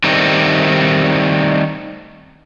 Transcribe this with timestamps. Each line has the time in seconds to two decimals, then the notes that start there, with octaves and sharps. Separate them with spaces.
0.04 D#3 G3 A3 C4 D#4